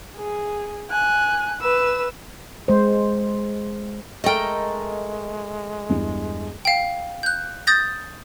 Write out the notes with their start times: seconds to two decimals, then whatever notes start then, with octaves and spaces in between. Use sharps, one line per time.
0.16 G#4
0.91 G#5 F#6
1.61 B4 E6
2.68 G#3 C5
4.24 G#3 A3 A4 A#4 D#5 G5
5.89 E2 G2
6.65 F5 G5
7.23 F#6 G6
7.67 D#6 G6 A6 A#6